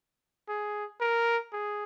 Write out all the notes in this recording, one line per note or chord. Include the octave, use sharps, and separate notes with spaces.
G#4
A#4
G#4